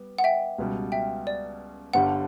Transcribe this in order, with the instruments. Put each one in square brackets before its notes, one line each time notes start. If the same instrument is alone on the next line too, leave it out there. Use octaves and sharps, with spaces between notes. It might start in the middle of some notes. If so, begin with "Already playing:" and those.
Already playing: [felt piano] G3 B3
[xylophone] F#5
E5 G5
[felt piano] C#2 B2 G3
[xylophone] E5 G5
D5
[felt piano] G1 G2 D3 G3 [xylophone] F#5